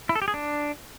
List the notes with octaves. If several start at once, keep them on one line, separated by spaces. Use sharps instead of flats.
E4
A4
G4
G#4
D4